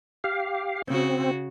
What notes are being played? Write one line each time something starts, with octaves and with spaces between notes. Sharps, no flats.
G4 F5
C#3 C4 F#4